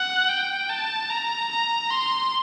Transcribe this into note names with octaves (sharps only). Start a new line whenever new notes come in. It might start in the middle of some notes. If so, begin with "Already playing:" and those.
Already playing: F#5
G5
A5
A#5
A#5
C6